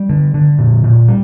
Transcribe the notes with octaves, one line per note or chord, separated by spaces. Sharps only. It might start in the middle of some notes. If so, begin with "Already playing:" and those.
Already playing: G3
D3
D3
A#2
A#2
G3